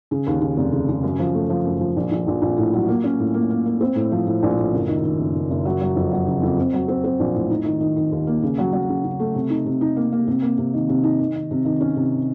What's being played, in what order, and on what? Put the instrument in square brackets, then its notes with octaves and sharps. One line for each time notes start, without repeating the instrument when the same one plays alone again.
[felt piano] C#3
D#2
C#3
F1
C#3
C#3
F#2
F3
A3
F3
F#2
F3
A#1
A#1
A#1
A#1
A2
F#3
A#3
C#4
A2
A#3
A#3
A#3
C4
A2
F3
A2
A#1
A2
F#1
D#3
D#3
F#1
F#1
F#1
F#3
F#3
F2
F#3
C#3
F2
C4
F#3
C4
C4
A#1
A2
D#4
D#3
D#3
D#3
D#2
A#3
C#3
F#3
F#3
C#3
C#3
A3
C3
D#4
C3
D#4
A#3
A#3
C3
A#3
C3
D#3
C3
D#4
D#3
D#3
C3
D#3
C#4
C3